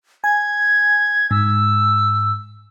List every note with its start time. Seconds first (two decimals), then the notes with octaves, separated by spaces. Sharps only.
0.24 G#5 G#6
1.31 G#2 E6